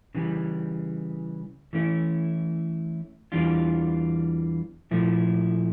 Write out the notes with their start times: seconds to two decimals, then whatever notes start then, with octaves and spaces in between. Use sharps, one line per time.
0.15 C#3 E3 G3
1.73 E3 A3 C#4 E4
3.32 E2 E3 G3 D4 F4
4.91 A#2 F3 A3 E4